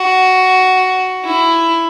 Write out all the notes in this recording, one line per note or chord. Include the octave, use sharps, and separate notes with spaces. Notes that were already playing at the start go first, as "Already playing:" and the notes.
Already playing: F#4
E4